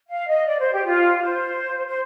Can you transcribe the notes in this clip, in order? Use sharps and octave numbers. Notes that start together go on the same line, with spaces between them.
F5
D#5
D5
C5
G4
F4
C5
C5